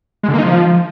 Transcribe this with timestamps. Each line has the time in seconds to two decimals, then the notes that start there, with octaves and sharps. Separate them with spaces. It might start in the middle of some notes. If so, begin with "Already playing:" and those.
0.23 G#3
0.28 D3
0.34 A#3
0.39 D#4
0.44 F3